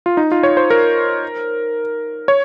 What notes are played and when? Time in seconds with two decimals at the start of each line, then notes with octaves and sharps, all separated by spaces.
0.06 F4
0.17 D#4
0.32 F4
0.43 C#5
0.57 C5
0.70 A#4
2.28 C#5